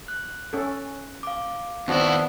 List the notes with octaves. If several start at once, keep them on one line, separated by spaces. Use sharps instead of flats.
F#6
C#4 A4
F5 D6
D#2 B3 C4 D4 E4 F#4